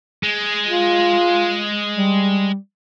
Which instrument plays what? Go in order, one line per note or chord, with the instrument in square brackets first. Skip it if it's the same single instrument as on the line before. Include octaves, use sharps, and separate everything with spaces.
[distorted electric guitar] G#3
[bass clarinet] F4
G3